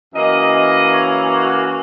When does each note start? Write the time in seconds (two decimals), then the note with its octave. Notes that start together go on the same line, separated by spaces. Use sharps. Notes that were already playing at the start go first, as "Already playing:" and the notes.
0.14 F#2 E3 A#3 D#5
0.53 D#5
0.93 C#5
1.33 F#4